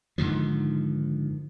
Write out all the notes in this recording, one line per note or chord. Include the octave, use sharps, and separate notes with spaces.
G#2 D3 D#3 F3